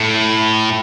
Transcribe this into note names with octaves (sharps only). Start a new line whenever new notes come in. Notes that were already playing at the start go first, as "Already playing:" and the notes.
Already playing: A2